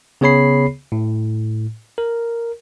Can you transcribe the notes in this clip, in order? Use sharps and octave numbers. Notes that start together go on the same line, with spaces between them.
C#3 B3 G#4 C#5 B5 C7
A2
A#4